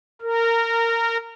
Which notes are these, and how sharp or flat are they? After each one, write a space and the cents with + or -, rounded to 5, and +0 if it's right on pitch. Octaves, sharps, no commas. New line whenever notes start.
A#4 -20